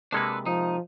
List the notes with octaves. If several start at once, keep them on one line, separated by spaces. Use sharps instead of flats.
C3 G#3 A#3 D4 A4 B4
F3 D#4